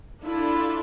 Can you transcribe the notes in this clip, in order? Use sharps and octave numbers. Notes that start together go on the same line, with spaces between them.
D4 E4 F4 A4